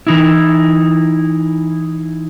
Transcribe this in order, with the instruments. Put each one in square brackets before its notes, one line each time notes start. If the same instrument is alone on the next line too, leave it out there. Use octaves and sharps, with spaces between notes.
[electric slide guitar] E3 D#4 E4